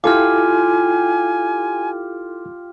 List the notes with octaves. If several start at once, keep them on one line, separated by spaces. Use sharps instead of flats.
E4 F4 G4 A4 F5 G#5 D6 F6